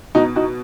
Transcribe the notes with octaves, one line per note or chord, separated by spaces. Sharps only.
B2 D#4 F#4
D#4 F#4